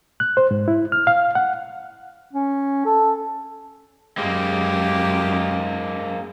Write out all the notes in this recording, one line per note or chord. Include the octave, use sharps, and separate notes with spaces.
F#6
C5
G#2
E4
F6
F5
F#5
C#4
A4
F#2 G#3 A#3 G4